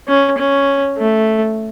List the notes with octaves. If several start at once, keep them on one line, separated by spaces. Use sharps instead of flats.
C#4
C#4
A3